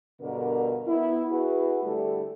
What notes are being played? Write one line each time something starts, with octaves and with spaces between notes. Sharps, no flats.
G2 B2 D3 A#4
B3 E4
E4 F#4 G#4 B4
D3 G3 A3 G4 A4